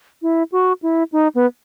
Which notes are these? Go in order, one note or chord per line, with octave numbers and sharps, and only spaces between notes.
E4
F#4
E4
D#4
B3